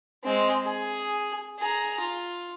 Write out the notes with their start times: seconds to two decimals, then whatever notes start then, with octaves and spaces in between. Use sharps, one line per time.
0.24 G#3 C4
0.65 G#4
1.60 G#4 A#5
2.01 F4